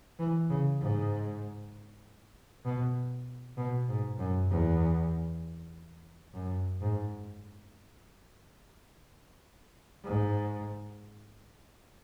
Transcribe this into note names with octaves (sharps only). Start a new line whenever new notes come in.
E3
C#3
G#2
B2
B2
G#2
F#2
E2
F#2
G#2
G#2